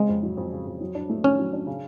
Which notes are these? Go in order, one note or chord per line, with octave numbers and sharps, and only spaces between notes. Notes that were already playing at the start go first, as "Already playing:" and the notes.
Already playing: C#3 G#3 C4
F2
F#3
F2
C#3
F2
F#3
D4
A3
D#3 C#4
F#3
D4
C#3